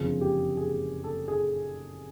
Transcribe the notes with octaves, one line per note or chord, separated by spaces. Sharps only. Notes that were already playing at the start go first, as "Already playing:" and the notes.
Already playing: F#1 F2 D3 F3 G#4
G4
G#4
A4
G#4